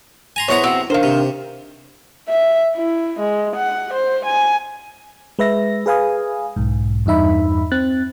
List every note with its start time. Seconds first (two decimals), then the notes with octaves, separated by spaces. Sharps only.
0.36 G#5 A#5 C6
0.48 E2 B3 C5 C#5 F#5 A#5
0.64 C4 F#4 C5
0.90 D#3 D4 A#4 C5 F5
1.03 C3
2.29 E5
2.76 E4
3.20 G#3
3.56 F#5
3.94 C5
4.26 G#5
5.39 G#3 B4 E5 A#6
5.86 G#4 B4 F5 G#5 D#6
6.56 B1 G#2
7.06 E2 G2 D#4 E5 B5
7.72 C4 F#6 A6